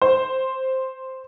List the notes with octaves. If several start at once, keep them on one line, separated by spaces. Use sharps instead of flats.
C5